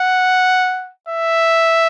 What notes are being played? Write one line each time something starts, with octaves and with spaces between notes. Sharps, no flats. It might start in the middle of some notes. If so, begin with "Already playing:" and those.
Already playing: F#5
E5